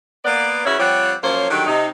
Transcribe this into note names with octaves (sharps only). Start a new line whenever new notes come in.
A#3 B3 D5
C#3 E3 C#4 F#4 C#5 E5
F3 G3 C4 G4 C#5 F#5
F#2 F3 A#3 C5 C#5
D3 D#3 F#3 G3 D#4 G4
C3 D#4